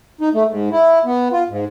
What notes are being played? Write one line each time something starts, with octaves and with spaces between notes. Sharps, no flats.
D#4
A3
G#2
E4
B3
F4
G#2